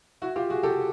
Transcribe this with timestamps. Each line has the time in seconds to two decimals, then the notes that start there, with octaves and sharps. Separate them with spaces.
0.22 E4 F#4
0.36 F4 G4
0.50 F#4 G#4
0.63 G4 A4